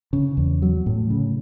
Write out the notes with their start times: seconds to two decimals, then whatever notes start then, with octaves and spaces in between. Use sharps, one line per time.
0.13 C#3
0.37 E2
0.62 F#3
0.86 A2
1.10 C#3